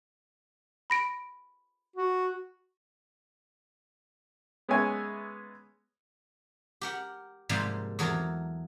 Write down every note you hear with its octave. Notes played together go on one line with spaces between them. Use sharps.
B5 A#6 D7
F#4
G#3 B3 C#4 C#5 E5 G#5
G4 A#4 F#5
G#2 C3 F3 G3 A#3
E2 F#3 A4 A#4